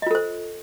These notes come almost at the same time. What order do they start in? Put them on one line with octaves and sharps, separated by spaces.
D#5 F4 A4 C5